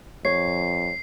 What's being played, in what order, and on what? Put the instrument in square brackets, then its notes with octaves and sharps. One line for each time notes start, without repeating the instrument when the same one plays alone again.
[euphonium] F2 [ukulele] C#5 [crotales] C7